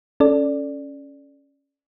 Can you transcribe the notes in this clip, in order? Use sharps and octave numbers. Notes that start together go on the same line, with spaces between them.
C#4 A4 D5